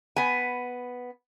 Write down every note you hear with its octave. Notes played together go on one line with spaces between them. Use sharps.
B3 G#5